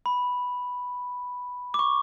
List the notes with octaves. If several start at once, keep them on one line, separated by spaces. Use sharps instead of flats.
B5
D6
C#6